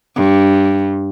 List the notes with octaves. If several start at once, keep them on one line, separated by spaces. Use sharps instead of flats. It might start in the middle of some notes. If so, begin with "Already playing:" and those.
G2